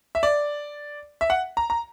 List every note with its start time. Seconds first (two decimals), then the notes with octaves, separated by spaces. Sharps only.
0.15 E5
0.23 D5
1.21 E5
1.30 F#5
1.57 A#5
1.70 A#5